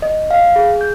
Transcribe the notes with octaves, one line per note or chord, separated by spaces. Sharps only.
D#5
F5
G#4
G6